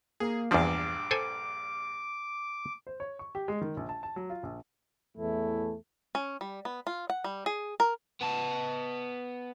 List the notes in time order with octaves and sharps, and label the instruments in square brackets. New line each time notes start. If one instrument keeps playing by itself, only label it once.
[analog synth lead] A#3 [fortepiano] G#4
[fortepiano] A#1 G2 [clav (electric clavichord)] E2 F3 [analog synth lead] D6
[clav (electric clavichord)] A4 C5 G#5
[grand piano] C5
C#5
C#6
G4
G#3
D#3
A#1
A5
A5
F#3
F4
A#1
[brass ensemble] E2 A2 E3 A3 E4
[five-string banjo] C#4
G3
B3
F4
F#5
G3
G#4
A#4
[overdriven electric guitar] B3 A5